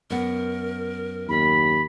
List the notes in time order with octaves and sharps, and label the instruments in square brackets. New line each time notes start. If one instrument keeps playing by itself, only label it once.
[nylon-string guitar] F#2 B3 [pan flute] A#4
[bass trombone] D#2 [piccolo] B5